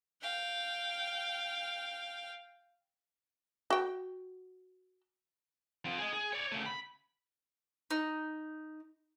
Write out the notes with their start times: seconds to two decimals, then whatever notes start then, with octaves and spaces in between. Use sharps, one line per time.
0.22 F5 G5
3.70 F#4 G5
5.85 F3 C4
5.98 G#4 D#5
6.13 G#4
6.33 C#5 D5
6.52 C#3 A3
6.66 B5
7.91 D#4